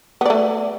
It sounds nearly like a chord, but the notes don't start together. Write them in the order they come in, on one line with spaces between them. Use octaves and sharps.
B3 D5 A3